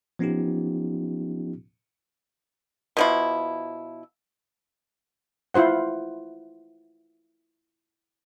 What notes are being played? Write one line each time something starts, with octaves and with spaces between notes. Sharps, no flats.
F3 B3 C#4 D#4 F4 G4
B2 F3 E4
E4 F4 C5 F#5